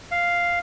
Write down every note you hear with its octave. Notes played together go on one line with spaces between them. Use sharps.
F5